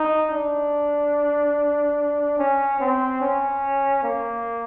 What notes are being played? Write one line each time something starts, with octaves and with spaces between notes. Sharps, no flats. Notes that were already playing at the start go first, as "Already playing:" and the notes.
Already playing: D#4
D4
C#4
C4
C#4
A#3